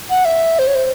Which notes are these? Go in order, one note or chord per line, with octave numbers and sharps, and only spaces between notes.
F#5
E5
C5
C#5
C5